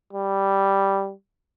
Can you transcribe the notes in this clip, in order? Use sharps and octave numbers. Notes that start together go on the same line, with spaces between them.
G3